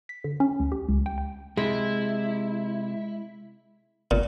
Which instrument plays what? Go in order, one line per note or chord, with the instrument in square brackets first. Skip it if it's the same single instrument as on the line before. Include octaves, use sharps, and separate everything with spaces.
[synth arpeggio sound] B6
D3
C#4
D2
G4
C#2
G5
G5
[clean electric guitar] C3 [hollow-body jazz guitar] G#3 [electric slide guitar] E4
[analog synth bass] G#1 [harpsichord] A#2